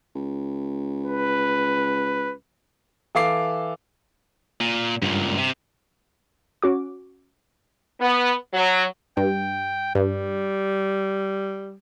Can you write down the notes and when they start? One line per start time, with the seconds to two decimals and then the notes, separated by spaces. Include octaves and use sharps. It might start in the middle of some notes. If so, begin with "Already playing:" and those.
0.15 C#2
1.04 B4
3.15 E3 A4 F5 D6 C7
4.60 A#2
5.02 C#2 G2 A#2
5.38 C3
6.62 C#4 F#4 D6
8.01 B3
8.54 F#3
9.17 G2 G5
9.95 G2 G3